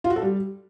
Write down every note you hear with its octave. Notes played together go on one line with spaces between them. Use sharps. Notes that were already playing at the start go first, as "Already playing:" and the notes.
F4
F#4
A4
G3